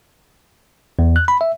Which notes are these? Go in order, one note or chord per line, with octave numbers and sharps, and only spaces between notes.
E2
F#6
B5
E5